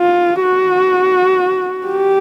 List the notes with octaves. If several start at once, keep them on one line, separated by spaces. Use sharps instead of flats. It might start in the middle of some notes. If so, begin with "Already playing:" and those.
Already playing: F4
F#4
G4